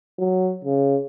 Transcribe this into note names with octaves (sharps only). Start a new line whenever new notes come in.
F#3
C#3